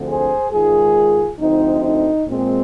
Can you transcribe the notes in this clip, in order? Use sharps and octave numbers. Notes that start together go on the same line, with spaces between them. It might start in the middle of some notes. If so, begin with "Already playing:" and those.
Already playing: D2 D3 F3 C4
G#4 C5
G#2 D#3 G#3 F4 G#4
D2 D3 F3 C4 D#4
D#4
A#2 G#3 C4